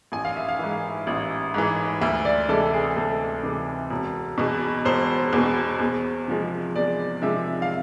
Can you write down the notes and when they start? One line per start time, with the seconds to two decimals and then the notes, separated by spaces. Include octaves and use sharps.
0.12 A1 G#5
0.25 F5
0.37 E5
0.48 F5
0.59 G#2 E3
1.07 A1
1.54 G#2 E3
2.01 D2 E5
2.25 D5
2.48 C3 E3 G#3 A4
2.73 G#4
2.96 D2 A4
3.43 C3 E3 G#3
3.90 E1
4.38 E2 B2
4.85 E1 C5
5.33 E2 B2
5.80 E2
6.28 C3 F3 G#3
6.75 E2 D5
7.22 C3 F3 G#3 E5
7.62 F5